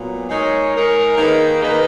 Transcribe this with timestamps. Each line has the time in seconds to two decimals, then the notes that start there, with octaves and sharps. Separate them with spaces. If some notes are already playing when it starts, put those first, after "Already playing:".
Already playing: A#2 F#3 B3
0.29 G#3 D#4 A#4 C#5
0.72 G#3 D#4 A#4 C#5
1.17 D#3 A#3 D#4 G#4 B4
1.61 D#3 A#3 D#4 G#4 B4